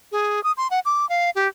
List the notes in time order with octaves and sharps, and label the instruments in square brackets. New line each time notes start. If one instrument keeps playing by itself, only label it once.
[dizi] G#4
D#6
C6
F#5
D6
F5
G4